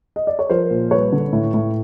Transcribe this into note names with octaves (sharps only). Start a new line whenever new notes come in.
D#5
D5
C#5
F3 A#4 C5
A#2
G3 B4 C#5
D3
A2
A2